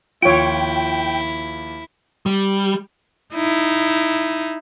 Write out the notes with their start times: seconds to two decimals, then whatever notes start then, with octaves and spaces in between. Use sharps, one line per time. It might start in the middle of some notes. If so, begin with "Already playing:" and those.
0.23 D#2 F3 E4 F4 C#5 G5
2.26 G3
3.34 D#4 E4